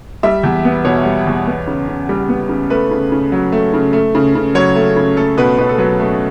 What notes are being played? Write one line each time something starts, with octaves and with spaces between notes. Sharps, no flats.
G3 E5
E2
B3
B2 C#5
G3
E2
B3
C#3
C#3
G3
B3
C#3
A3 B4
C#3
C#3
F#3
A3
C#3
A3
C#3
C#3
F#3 C#5
A3
C#3
A3 A4
B2 B4
B2 B4
A4
F#3 B4
A3